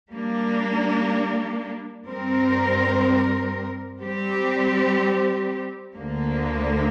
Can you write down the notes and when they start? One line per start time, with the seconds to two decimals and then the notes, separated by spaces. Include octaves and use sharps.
0.11 G3 A#3 D4
2.06 G2 G3 C4 A#4
4.00 G3 C4 G4
5.95 D2 D3 A#3